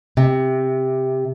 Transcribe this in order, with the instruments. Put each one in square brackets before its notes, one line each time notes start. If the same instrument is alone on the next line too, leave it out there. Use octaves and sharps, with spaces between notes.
[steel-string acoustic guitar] C3